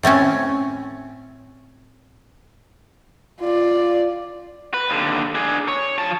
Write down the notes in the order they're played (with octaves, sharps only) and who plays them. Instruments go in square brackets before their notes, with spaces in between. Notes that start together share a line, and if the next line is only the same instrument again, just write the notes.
[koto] A2 A3 C4 C#4
[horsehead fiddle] F4 D5
[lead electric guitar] B4
D#2 D3
D4 G#4
C#5
F3 A5